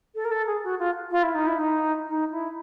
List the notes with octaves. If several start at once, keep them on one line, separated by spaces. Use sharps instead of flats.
A4
A#4
A4
G#4
F#4
F4
F4
E4
D#4
E4
D#4
D#4
E4